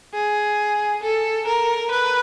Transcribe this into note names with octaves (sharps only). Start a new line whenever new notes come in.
G#4
A4
A#4
B4